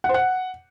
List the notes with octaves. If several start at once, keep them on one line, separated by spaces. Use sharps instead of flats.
F#5
C5
F#5